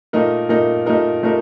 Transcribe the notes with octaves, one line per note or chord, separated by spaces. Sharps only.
A#2 A3 D#4 A#4
A#2 A3 D#4 A#4
A#2 A3 D#4 A#4
A#2 A3 D#4 A#4